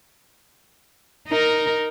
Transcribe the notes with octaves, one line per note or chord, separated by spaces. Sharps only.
D#4 A#4